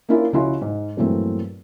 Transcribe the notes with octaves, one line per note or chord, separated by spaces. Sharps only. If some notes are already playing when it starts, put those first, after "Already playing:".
A#3 C#4 D4 E4 F4 A#4
C#2 F3 C#4 E4 F#4 C6
G#2
G2 A#2 E3 F#3 A3 C4